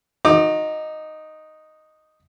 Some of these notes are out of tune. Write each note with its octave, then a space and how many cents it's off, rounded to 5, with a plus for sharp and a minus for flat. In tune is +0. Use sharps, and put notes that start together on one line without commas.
D#4 +0 F#4 -30 D6 +30